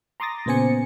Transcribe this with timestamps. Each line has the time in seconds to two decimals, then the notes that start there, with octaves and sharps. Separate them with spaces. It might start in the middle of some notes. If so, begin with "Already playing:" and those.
0.20 A#5 C6 D6 D#6 A6 A#6
0.46 A#2 C#3 B3 C5 G#5 C#7